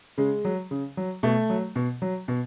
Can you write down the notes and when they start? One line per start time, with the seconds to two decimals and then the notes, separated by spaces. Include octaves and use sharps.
0.18 C#3 G#3
0.45 F#3
0.71 C#3
0.97 F#3
1.23 B2 A3
1.50 F#3
1.76 B2
2.02 F#3
2.28 B2